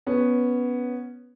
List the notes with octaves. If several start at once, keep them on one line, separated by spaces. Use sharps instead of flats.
B3 C#4